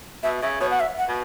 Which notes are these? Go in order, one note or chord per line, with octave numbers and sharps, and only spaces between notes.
B2 E5
C#3 E5
B2 C#5
F#5
E5
F#5
B2